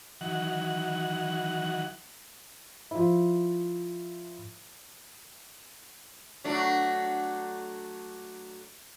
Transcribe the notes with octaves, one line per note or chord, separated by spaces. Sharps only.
D#3 E3 F#3 F#5
F3 E4
F#3 A3 D4